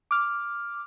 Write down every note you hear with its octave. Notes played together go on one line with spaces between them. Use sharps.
D6 F6